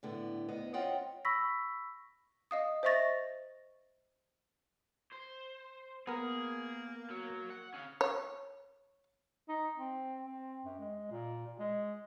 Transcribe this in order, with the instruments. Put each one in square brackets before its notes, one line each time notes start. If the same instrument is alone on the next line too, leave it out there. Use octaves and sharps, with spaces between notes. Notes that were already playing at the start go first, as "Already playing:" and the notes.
[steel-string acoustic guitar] A2 D3 B3
D2 B3 D#5
C4 C#4 F4 D#5 F#5 G5
[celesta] B5 C#6 E6 A#6 B6
[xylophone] D#5 F5 D#6
C5 D#5 E5 C#6 A6 A#6
[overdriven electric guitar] C5
[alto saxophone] A#3 [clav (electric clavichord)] B3 A#4 [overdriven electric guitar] G#4
[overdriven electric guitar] F#3
F#5
C#4 F5
[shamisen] C#5
[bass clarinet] D#4
C4
C4
F#2
G#3
A#2
A#2
G#3